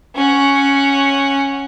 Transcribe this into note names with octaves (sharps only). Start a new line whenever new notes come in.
C#4 F#5